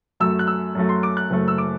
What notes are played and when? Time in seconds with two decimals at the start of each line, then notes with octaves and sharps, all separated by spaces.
0.20 F#2 F#3 A3 E6
0.39 F#6
0.47 E6
0.75 F#2 F#3 A3
0.89 C6
1.03 D6
1.17 F#6
1.30 F#1 F#2 F#3 A3
1.48 E6
1.58 D6